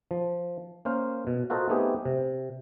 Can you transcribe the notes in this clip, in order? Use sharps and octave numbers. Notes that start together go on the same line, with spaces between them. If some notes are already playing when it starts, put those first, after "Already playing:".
F3
A#3 C#4 C5 F5
B2
F4 F#4 A4 A#4 C5 D#5
A3 B3 C4 D#4 G4 G#4
C3